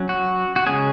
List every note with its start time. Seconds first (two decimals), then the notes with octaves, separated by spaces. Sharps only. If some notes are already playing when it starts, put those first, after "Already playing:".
Already playing: F#3 C#4
0.09 F#4
0.56 F#4
0.66 C#3 G#3 C#4 G#4